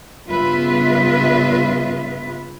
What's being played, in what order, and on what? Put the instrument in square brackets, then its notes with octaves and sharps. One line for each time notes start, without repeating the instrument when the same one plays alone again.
[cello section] G2 C#3 B3 F4 B4 E5